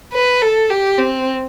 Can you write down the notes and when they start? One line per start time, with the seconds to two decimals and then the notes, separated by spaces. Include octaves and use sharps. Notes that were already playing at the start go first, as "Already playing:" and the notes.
0.13 B4
0.42 A4
0.70 G4
0.99 C4